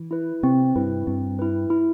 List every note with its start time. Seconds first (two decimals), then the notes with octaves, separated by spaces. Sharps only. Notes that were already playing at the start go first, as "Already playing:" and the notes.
Already playing: E3
0.11 E4 B4
0.43 C3 C4
0.76 G2 E4 B4
1.07 G2 C4
1.39 E4 B4
1.70 E4